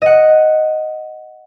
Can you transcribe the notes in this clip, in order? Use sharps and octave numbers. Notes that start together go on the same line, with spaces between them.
D#5 F#5